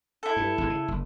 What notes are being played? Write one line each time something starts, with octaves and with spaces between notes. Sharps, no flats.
E4 A4
G2
G#1 E2 G2
C#3
F#1